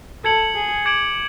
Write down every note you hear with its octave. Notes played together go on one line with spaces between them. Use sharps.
A4 G#6 C#7 F#7
G#4
D6 G#6 D7 F#7